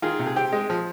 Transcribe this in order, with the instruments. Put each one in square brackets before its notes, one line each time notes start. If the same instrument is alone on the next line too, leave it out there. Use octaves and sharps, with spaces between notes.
[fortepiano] D#3 F4 G#4
C3
G#4
C4 G4
G#3
F3